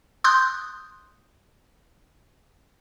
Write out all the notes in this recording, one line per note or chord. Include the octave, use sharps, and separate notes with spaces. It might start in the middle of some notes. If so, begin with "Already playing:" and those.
C6 D#6 F#6 G6